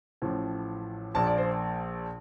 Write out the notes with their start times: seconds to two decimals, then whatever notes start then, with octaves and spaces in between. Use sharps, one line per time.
0.22 A1 A2 F3
1.14 A#1 A#2 F3 A5
1.27 D5
1.38 C5